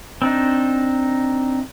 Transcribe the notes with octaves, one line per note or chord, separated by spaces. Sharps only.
C4 D4 D#4